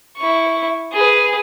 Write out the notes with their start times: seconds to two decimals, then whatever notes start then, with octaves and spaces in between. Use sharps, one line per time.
0.17 E4 C#6
0.93 G#4 B4